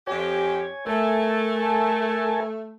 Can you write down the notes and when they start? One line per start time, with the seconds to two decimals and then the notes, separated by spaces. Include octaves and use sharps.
0.07 F2 G4 C#5 G#5
0.87 A3 A#4 G#5 A5